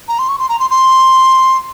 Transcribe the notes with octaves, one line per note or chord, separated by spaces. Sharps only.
A#5
C6
C#6
C6
A#5
C6
C6